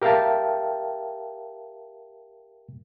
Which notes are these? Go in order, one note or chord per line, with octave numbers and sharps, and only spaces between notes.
G4 A#4 E5 F5 G5 A5